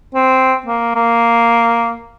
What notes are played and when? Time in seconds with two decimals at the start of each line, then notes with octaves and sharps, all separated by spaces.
0.15 C4
0.66 A#3
0.95 A#3